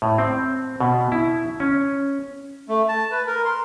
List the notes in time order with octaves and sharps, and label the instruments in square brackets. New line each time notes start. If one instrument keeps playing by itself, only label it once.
[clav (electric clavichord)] A2
C4
B2
E4
C#4
[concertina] A3
A5
B4
A#4
C6